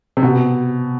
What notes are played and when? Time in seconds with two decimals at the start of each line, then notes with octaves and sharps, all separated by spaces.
0.17 C3
0.23 B2